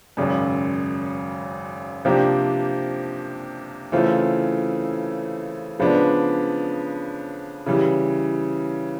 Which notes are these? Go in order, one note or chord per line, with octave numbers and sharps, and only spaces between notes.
G#1 F#2 C#3
C3 F3 A#3 D4 G4
C#3 E3 A3 C4 F4
C#3 F3 G#3 B3 D4
C#3 E3 G3